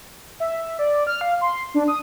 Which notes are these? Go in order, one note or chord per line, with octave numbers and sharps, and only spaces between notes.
E5
D5
F6
F5
C6
D4
D#6